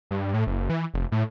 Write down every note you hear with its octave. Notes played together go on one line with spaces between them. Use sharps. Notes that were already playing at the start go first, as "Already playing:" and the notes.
G2
A2
F#1
E3
F1
A2